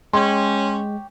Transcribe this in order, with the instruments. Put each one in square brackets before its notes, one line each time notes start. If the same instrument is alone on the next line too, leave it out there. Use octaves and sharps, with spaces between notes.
[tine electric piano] G#3 [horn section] C#4 [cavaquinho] G4 C#5 G5 [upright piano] C6